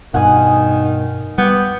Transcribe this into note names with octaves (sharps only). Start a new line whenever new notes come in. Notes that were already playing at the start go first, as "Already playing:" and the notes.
G2 B2 D#3 F#5 G#5 D#6
G3 B3 D6 G6